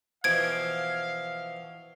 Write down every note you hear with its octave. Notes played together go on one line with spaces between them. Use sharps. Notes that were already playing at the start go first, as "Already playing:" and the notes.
B2 E3 F3 F5 G#6 D7